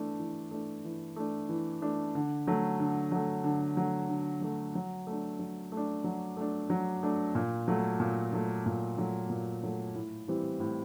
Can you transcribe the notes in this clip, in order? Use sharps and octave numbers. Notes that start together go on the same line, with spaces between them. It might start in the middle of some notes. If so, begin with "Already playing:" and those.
Already playing: E3 A3 D4
E3
A3 D4
E3
A3 D4
E3
A3 D4
D3
F#3 A3
D3
F#3 A3
D3
F#3 A3
D3
F#3 A3
F#3
A3 D4
F#3
A3
D4
F#3
A3 D4
F#3
A3 D4
A#2
F#3 A3
A#2
F#3 A3
A#2
F#3 A3
A#2
F#3 A3
A2
E3 G3 C4
A2